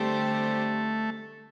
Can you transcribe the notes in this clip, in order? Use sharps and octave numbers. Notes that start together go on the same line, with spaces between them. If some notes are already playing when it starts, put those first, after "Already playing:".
Already playing: D3 G3 A3 C4 G4 C5